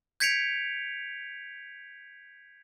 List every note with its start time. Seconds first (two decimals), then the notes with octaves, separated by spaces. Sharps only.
0.20 G6 G#6 B6 C#7 D7 F7